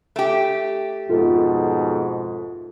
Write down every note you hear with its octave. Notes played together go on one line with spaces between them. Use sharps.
A3 G4
F2 G#2 B2 F4 A4